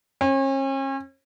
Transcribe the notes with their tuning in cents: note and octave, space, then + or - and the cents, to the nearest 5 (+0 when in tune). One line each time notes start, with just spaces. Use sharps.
C#4 -40